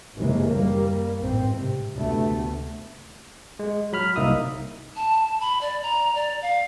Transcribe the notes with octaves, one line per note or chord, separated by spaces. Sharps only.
F#1 D#2 C3 E3 G#3 A#3
G3 A#3
A1 G#2 C4
C3
D2 C3 A3 B3
G#3
F#3 B5 F6
C2 A#3 D#4 E5 D#6
A5
B5
D5
A#5
D5
F5